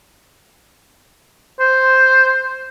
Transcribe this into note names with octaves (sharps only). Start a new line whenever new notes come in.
C5